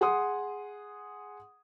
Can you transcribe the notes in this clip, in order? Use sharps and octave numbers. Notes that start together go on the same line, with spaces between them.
G#4 F#5 C6 D#6